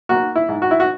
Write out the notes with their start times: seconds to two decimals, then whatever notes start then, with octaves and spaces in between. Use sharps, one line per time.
0.09 A#3 F#4
0.35 E4
0.49 G#2
0.62 F#4
0.71 E4
0.80 F#4